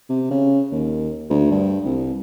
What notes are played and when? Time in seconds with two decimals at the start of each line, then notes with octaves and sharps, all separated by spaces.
0.09 C3
0.31 C#3
0.72 D#2
1.30 D2
1.51 G2
1.86 C2